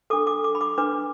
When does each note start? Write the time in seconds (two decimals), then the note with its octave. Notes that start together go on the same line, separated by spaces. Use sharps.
0.10 D4 A4 D6
0.27 D6
0.44 D6
0.55 B5
0.61 D6
0.78 D4 B4 D6